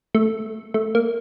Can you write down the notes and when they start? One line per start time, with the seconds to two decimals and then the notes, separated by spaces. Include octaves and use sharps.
0.15 A3
0.74 A3
0.95 A#3